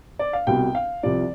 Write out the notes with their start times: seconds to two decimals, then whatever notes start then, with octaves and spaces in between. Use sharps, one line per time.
0.19 D5
0.33 F5
0.47 C2 B2 G3 G5
0.75 F5
1.03 C2 C3 F3 D5